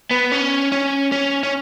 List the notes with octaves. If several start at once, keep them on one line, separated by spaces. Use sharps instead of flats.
B3
C#4
C#4
C#4
C#4